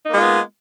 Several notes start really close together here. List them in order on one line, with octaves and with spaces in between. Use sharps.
D#4 A#3 G#3 F4 B3